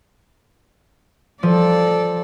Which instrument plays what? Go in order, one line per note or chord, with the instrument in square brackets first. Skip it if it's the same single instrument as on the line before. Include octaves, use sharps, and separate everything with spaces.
[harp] F3 [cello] A4 D5